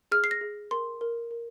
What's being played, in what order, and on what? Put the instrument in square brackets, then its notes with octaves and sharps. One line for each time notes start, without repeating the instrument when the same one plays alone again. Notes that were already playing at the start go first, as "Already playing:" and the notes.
[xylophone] G#4 F6
C7
A#6
G#4
A#4 C6
A#4
A#4